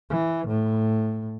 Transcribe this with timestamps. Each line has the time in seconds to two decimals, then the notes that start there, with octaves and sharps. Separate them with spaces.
0.10 E3
0.48 A2